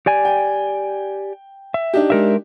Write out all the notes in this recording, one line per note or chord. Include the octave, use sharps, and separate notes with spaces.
G4 D5 G#5
G5
E5
D4 D#4 G4
G#3 A#4 E5